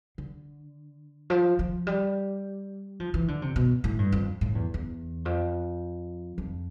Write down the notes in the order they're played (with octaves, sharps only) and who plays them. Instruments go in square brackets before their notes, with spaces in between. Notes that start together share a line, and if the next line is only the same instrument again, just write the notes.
[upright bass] D3
F3
F3
G3
F3
E3
D3
C3
B2
A2
G2
F2
A2
E2
E2
F2
F2